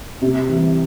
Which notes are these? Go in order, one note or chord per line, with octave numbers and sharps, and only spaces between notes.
C3
E3 G3